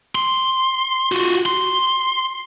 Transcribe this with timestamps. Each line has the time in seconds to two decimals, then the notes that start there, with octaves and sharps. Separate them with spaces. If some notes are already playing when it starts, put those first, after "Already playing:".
0.15 C6
1.12 F4 F#4
1.46 C6